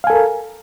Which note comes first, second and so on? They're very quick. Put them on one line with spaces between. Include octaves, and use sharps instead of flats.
F5 G#5 A4 A#4